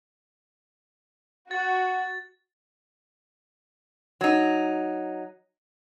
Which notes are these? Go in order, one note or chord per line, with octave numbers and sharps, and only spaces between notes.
F#4 A6
F#3 D#4